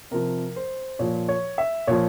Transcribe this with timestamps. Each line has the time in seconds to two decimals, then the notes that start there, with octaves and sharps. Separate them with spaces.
0.11 C3 F3 A#4
0.56 C5
0.99 A#2 F3 C#5
1.28 C#5
1.58 E5
1.87 A#2 F3 C#5